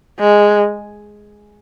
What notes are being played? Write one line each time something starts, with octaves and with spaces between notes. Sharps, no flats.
G#3